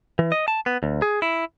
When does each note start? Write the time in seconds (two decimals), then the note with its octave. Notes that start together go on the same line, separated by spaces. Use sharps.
0.19 E3
0.32 D#5
0.48 A5
0.66 B3
0.83 D2
1.02 G#4
1.22 E4